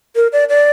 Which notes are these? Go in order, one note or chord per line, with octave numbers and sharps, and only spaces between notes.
A#4
D5
D5